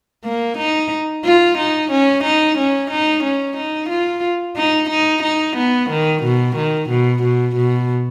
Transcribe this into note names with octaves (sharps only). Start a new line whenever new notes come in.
A#3
D#4
F4
D#4
C#4
D#4
C#4
D#4
C#4
D#4
F4
D#4
D#4
D#4
B3
D#3
B2
D#3
B2
B2
B2